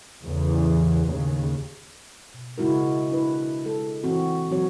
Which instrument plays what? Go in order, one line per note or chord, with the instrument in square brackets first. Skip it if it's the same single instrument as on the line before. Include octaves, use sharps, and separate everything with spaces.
[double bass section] E2 A2 C#3
D#2 C#3
[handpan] B2
C#3 G#3 E4 F#4 A#4
D4 E4 B4
G#3 A4
A#2 E3 C4 F#4
A#2 F#3 C4 F#4 C#5